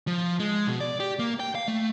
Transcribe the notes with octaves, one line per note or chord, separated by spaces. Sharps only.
F3
G#3
B2
D5
G4
A#3
G5
F5
A3